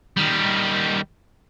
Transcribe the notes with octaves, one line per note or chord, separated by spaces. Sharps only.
D#3 G3